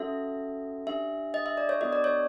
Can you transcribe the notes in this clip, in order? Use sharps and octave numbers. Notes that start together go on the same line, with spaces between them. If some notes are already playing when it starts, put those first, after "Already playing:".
Already playing: C#4 F#4 A4 E5
D4 G4 E5
D#5
E5
D5
C#5
B3 D4 F#4 A4 D#5
D5
C#5